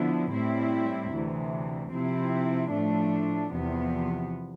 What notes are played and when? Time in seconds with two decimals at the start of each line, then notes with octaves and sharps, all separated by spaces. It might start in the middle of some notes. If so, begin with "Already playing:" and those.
Already playing: D3 F3 B3 E4
0.33 A2 G3 C4 E4
1.11 D2 C3 E3
1.92 C3 F3 C4 E4
2.70 A2 F3 A3 D4
3.51 E2 C3 F3 B3